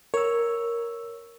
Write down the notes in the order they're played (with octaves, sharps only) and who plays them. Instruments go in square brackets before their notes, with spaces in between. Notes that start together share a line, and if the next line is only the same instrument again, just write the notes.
[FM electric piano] A#4 [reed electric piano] C#5 E6